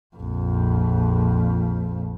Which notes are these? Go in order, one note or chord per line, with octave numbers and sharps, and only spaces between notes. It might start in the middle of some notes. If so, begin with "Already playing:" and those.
A#1 F2